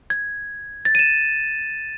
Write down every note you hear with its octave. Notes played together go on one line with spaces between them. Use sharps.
G#6
A6
D#7
E7